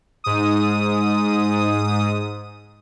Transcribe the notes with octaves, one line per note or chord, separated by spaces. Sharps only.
G#2 D#6